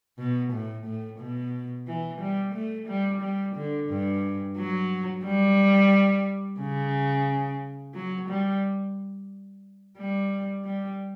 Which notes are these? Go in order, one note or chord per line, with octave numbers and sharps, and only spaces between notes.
B2
A2
A2
B2
E3
G3
A3
G3
G3
D3
G2
F#3
G3
C#3
F#3
G3
G3
G3